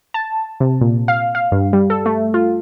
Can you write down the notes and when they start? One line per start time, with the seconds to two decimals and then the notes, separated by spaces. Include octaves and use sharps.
0.14 A5
0.60 C3
0.81 A#2
1.08 F5
1.35 F5
1.52 G2
1.73 G3
1.90 A4
2.06 A3
2.34 F4